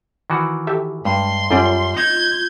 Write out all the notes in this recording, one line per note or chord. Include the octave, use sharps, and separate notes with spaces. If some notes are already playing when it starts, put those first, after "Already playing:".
D#3 E3 F#4
G4 A4 E5
G2 G#3 C6
F#2 G3 C#4 F4 A4 D5
D#4 G6 G#6